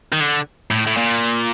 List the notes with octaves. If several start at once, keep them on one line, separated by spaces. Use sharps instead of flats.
D#3
D3
A2
A2
A#2